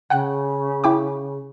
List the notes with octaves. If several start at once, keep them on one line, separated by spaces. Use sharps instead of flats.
C#3 F#5 G5 F#6
E4 G5 D6